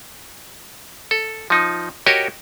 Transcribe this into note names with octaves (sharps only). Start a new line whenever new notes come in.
A4
F3 D#4
F#4 G4 A#4 C#5 D#5